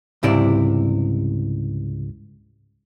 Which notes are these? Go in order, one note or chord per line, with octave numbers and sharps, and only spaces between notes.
C#2 G#2 C3 G3 E4 D5